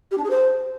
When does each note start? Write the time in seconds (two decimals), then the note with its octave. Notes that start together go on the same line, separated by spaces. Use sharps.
0.11 G4
0.17 D4
0.24 G#4
0.30 C5